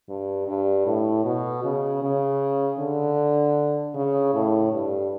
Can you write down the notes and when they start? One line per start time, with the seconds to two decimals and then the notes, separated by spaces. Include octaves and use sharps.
0.09 G2
0.48 G2
0.86 A2
1.25 B2
1.64 C#3
2.03 C#3
2.79 D3
3.95 C#3
4.34 A2
4.72 G2